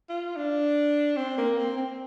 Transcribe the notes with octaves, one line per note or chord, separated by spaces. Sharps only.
F4
D4
C4
A#3
C4
C4